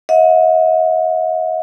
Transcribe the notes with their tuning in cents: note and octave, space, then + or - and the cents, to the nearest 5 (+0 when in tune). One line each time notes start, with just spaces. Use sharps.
D#5 +40 F#5 -45